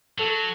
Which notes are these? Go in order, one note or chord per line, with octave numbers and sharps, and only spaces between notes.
F#3 A4